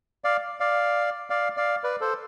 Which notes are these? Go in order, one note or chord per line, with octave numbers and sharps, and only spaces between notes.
D5 F5
D5 F5
D5 F5
D5 F5
B4 D5
A4 C5